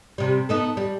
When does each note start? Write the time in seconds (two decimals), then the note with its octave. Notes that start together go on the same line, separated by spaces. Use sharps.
0.18 C3 G3
0.49 B3 D#4 A4
0.77 G3